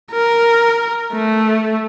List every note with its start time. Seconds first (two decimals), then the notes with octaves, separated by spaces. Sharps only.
0.12 A#4
1.13 A3